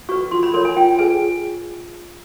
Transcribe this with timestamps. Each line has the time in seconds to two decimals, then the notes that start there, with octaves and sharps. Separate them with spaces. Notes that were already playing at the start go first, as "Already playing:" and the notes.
0.09 F#4 B4 C#6
0.31 F4 C6
0.43 B5
0.54 A#4 C#5 C6
0.65 G#5
0.77 F4 G5
0.99 G#4 B4 G#5